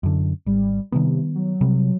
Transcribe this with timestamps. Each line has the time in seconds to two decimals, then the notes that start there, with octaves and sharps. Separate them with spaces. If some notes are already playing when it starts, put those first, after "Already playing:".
0.03 F#2 D3
0.46 G#1 G3
0.92 C3 D#3 G3 B3
1.35 F#3
1.61 C3 G3